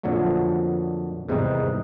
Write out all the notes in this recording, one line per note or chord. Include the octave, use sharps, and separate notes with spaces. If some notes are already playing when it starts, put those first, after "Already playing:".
F2 A#2 D3 F3 F#3 A3
E2 G#2 C3 D#3 G3 D#4